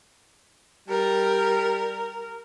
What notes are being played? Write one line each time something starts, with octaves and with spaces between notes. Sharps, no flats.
G3 A#4